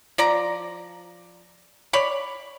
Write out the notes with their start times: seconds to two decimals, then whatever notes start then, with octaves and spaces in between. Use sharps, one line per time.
0.18 F3 D5 A#5
1.93 C#5 D5 B5